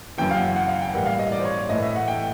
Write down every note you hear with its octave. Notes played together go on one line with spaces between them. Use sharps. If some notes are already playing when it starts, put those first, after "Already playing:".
F#2 C#3 E3 G5
F5
F#5
F#5
F5
G5
A2 E3 G3 A#3 F#5
F5
D#5
D5
C5
C#5
A2 E3 A3 D#5
E5
F#5
G5